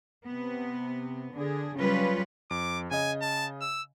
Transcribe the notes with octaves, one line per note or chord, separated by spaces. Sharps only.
C3 B3
D3 D4 G#4
C#3 F#3 G3 C#4 F4 B4
F2 D6
C#3 D#5 G#5
A5
E6